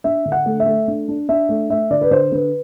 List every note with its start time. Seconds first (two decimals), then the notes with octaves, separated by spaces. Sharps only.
0.04 D4 E5
0.25 D3
0.32 F#5
0.46 A3
0.60 E5
0.66 A3
0.88 D4
1.08 D4
1.29 D4 E5
1.49 A3
1.70 A3 E5
1.90 D3 D5
2.01 B4
2.11 D3 C5
2.32 D3 B4